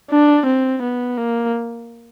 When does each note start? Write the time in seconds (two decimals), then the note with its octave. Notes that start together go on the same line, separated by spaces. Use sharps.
0.10 D4
0.46 C4
0.82 B3
1.17 A#3